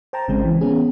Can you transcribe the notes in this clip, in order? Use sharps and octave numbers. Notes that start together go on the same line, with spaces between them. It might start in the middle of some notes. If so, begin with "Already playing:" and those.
C5 G5 A5 A#5
G#1 C#3 G#3 C4
E3
B3 C#4 G#4